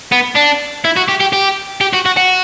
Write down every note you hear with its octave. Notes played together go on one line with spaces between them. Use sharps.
B3
D4
E4
F#4
G4
G4
G4
G4
F#4
F#4
F#4